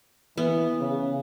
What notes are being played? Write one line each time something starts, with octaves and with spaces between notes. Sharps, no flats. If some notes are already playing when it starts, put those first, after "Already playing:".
E3 B3
C#3